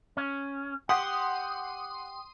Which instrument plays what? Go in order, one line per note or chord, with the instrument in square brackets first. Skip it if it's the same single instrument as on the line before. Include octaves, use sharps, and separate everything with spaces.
[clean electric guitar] C#4
[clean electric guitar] G4 [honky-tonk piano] F#5 [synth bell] C6 D#6